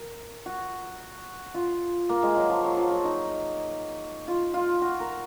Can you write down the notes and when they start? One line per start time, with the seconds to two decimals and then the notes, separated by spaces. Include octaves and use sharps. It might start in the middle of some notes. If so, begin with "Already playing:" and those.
Already playing: A#4
0.46 F#4
1.54 F4
2.09 A#3
2.23 G#3
2.36 F#3
2.50 F3
2.64 F#3
2.77 F3
2.91 F#3
3.04 D#4
4.28 F4
4.54 F4
4.81 F#4
5.00 A#4